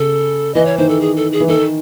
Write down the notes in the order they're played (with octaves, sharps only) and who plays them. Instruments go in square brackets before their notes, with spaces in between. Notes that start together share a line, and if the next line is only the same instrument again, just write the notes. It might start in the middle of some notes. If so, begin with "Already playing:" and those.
Already playing: [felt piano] C#3 [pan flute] A4
[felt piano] E3 [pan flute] D#5
[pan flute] C#5
[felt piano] D#3 [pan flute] C5
[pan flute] A4
G#4
A4
G#4
[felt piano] E3
[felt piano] D#3 [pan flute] A4